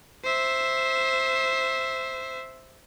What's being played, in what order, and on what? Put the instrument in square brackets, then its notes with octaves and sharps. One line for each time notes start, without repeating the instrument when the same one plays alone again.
[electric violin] C5 E5